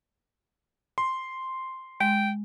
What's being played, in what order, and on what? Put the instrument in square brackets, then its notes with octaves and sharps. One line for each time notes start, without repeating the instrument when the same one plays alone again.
[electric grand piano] C6
[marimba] G#3 [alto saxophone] G5